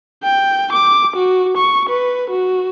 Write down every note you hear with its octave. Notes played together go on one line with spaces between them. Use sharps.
G5
D6
F#4
C#6
B4
F#4